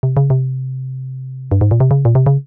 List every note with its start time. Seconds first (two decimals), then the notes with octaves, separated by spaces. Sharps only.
0.03 C3
0.17 C#3
0.30 C3
1.51 G2
1.61 G#2
1.71 A#2
1.80 C3
1.91 C#3
2.05 A#2
2.15 C3
2.26 C#3